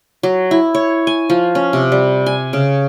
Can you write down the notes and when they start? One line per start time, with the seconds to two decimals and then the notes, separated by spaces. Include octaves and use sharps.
0.23 F#3
0.51 E4
0.75 C#5
1.07 G#5
1.30 F3
1.55 C#4
1.73 C3
1.92 G3
2.26 G#5
2.53 C#3